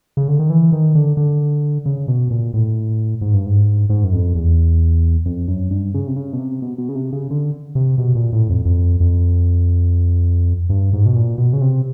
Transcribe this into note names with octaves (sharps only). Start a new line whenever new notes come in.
C#3
D3
D#3
E3
D#3
D3
D3
C#3
B2
A#2
A2
G#2
G2
G#2
G#2
F#2
F2
E2
F2
F#2
G2
C#3
C3
C#3
B2
C3
B2
B2
C#3
C3
C#3
D3
C3
B2
A#2
A2
F2
F2
F2
G2
G#2
B2
A#2
B2
C#3
C3